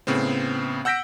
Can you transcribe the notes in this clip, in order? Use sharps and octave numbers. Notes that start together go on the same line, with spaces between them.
A2 C#3 B3 C4
F#5 E6 G6 A#6 B6 D7